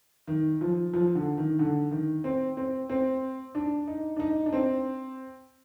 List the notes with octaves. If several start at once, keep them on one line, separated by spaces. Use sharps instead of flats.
D#3
F3
F3
D3
D#3
D3
D#3
C4
C4
C4
D4
D#4
D4
D#4
D4
C4